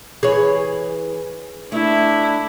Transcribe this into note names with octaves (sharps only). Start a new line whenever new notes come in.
E3 G#4 C#5
A3 D4 E4